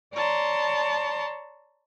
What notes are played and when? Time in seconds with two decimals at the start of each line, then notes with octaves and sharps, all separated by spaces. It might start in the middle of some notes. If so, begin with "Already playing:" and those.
0.15 C#5 D5 A5 A#5 C6